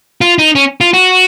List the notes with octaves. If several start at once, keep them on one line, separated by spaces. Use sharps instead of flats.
F4
D#4
C#4
F4
F#4